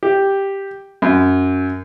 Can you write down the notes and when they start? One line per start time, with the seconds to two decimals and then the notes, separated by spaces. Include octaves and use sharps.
0.03 G4
1.02 F#2